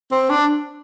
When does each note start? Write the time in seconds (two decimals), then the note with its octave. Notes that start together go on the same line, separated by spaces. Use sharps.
0.11 C4
0.29 D4